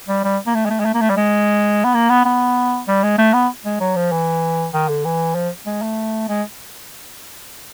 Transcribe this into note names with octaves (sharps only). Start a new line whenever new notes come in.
G3
G3
A#3
A3
G#3
A3
G#3
A3
A#3
A3
G3
G#3
B3
A#3
B3
B3
G3
G#3
A3
B3
G#3
F#3
F3
E3
D#3
D3
E3
F3
G#3
A3
G#3